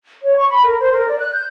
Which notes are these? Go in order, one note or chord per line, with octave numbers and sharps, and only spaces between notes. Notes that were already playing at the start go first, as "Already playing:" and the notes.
C#5
C#6
B5
A#4
C5
A#4
D5
F#6
G6